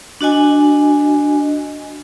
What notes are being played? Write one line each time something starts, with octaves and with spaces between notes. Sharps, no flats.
D4 F#4 D#5 G#5